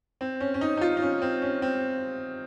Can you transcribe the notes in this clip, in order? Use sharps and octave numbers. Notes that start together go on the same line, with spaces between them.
C4
C#4
C#4
D#4
D#4
F4
D#4
C#4
C4
C#4
C4